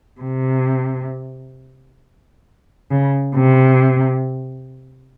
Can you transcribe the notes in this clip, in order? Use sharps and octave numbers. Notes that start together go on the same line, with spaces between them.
C3
C#3
C3